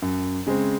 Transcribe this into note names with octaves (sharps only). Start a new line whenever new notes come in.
F#2
C#3 G#3 C4